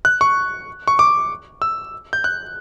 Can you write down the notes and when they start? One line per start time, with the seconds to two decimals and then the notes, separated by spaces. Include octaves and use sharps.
0.05 F#6
0.21 C#6
0.88 C#6
0.99 D6
1.62 E6
2.13 G6
2.24 F#6